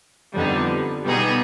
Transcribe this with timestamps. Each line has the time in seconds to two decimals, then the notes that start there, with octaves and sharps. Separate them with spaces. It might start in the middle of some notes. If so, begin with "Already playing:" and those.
0.34 F2 D3 G3 B3 D#4
1.04 B2 G3 B3 D#4 G#4